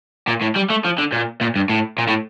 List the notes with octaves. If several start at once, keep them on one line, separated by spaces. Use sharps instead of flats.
A#2
A2
G3
A3
F3
D3
A#2
A#2
G2
A2
A#2
A2